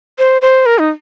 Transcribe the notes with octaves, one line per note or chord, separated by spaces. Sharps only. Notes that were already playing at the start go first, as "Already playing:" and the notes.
C5
C5
A#4
D#4